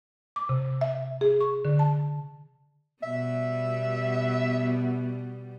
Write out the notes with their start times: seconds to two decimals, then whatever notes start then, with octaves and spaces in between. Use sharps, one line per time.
0.36 D6
0.49 C3
0.81 E5
1.21 G#4
1.41 C#6
1.65 D3
1.79 A5
3.03 B2 G3 B3 E5